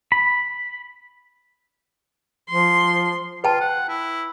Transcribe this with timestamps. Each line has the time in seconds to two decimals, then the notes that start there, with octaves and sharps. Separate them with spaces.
0.12 B5
2.50 F3 C6
3.44 F4 B4 G5 A5
3.60 F#5
3.89 E4